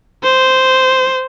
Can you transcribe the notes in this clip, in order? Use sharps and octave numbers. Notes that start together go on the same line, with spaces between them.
C5